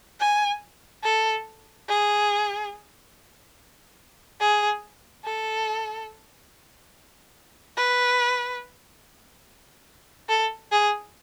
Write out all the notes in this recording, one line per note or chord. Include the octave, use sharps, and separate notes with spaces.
G#5
A4
G#4
G#4
A4
B4
A4
G#4